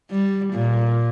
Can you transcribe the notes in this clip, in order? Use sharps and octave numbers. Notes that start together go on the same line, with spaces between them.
G3
A#2